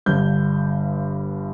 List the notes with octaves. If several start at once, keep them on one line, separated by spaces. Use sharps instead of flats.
G1 G2 D3 G6